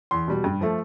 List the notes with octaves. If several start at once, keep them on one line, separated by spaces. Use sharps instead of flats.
E2 C6
B2 G3
G2
F3 A3